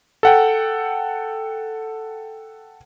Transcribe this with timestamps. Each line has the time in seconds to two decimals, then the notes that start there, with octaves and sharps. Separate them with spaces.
0.23 A4 F#5 G5